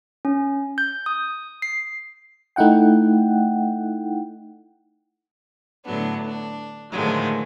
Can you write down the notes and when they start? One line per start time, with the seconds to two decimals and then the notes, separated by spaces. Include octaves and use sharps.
0.25 C#4
0.78 G6
1.06 D#6
1.62 C7
2.56 A3 D#4 E4 F#5 G5
5.85 A2 D3 F#3 B3 D4
6.26 D4
6.91 A2 D3 D#3 F3 F#3 G#3